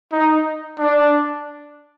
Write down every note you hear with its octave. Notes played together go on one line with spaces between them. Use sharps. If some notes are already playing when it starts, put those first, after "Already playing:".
D#4
D4